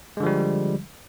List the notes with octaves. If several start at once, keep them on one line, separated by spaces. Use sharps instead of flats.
D3 F3 G3 G#3